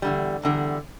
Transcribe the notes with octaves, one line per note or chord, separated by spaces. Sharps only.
E2 D3 G3
E2 D3 G3